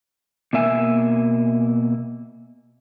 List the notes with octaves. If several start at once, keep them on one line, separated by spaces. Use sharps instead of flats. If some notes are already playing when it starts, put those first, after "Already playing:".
B2 A#3 E5 G#5